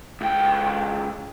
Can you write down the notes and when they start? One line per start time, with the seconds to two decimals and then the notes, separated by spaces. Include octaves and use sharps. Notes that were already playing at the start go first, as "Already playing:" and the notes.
0.21 C#2 G5